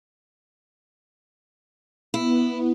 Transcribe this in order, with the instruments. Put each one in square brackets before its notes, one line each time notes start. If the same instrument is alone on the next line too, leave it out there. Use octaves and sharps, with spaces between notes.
[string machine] B3 [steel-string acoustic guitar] E4